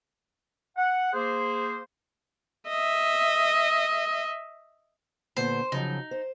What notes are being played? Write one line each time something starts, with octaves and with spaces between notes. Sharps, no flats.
F#5
A#3 G#4 C5
D#5 E5
A#2 D3 B3 C5
C#3 F3 F#3 D#4
C5